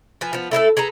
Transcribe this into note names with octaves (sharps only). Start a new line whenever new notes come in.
F3 B4 G#5
F3 B3
A3 E4 G#4 A4
G#4 A4 B4 A#5